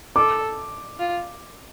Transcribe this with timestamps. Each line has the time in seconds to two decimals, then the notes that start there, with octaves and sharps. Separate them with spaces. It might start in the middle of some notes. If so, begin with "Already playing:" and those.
0.16 A4 D6
0.99 F4